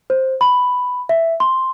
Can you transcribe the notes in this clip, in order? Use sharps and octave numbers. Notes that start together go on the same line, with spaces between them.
C5
B5
E5
C6